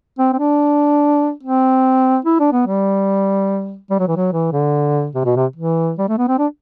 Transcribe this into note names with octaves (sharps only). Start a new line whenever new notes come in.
C4
C4
D4
C4
E4
D4
B3
G3
G3
F#3
E3
F#3
E3
D3
C3
B2
C3
E3
G3
A3
B3
C4
D4